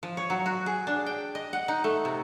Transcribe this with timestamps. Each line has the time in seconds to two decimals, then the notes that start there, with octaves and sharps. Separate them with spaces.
0.03 F3
0.17 C#5
0.30 F#3
0.46 F#4
0.66 G#4
0.87 D4
1.06 G5
1.35 D#5
1.53 F#5
1.68 D#4
1.84 A3
2.05 C3